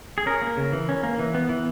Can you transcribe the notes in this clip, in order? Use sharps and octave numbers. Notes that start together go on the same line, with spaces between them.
G#4
C#4 A#4
A#3
C#3
E3
C#4
A#3
E3
B3
E3